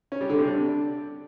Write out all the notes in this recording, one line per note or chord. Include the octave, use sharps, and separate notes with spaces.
C#4
G3
D3
C3
D4